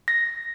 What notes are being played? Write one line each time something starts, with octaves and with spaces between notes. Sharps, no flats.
A#6